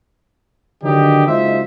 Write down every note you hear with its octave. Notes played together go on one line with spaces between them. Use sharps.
D3 D#3 F#3 D4 D#4 G4
F#1 G#3 D#4 F4 C5 E5